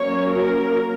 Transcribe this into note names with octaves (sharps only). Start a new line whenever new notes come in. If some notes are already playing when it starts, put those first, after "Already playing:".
Already playing: F#3 A#3 C#4 C#5
A#4